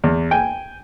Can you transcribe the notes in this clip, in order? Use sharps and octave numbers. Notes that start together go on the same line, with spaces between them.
E2
G5 G#5